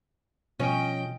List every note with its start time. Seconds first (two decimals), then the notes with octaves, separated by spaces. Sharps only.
0.60 B2 F3 C#4 D#5 G5